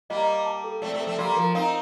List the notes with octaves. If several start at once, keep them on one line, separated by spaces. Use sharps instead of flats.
G3 A#3 D#5
D6
A5
A4
A3 C4 D5
A3 C4
A4
A3 C4
G3 A#3 C6
F3 A#4
C4 D#4 F5